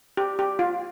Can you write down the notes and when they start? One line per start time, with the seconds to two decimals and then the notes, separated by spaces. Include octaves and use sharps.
0.17 G4
0.39 G4
0.59 F4